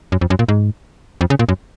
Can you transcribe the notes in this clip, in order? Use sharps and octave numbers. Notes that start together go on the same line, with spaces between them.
F#2
F2
F#2
A#2
G#2
F2
C#3
A#2
F#2